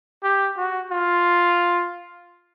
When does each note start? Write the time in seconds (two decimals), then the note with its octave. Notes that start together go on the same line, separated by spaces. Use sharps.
0.23 G4
0.57 F#4
0.92 F4